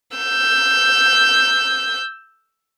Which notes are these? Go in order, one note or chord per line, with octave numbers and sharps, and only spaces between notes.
E6 G6